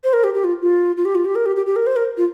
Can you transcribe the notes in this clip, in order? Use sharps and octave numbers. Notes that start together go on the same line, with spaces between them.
C5
A#4
G4
G4
F4
F4
F4
G4
F4
G4
A#4
G4
G4
G4
A#4
C5
A#4
F4